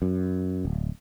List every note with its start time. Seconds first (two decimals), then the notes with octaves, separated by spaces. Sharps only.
0.02 F#2
0.65 D1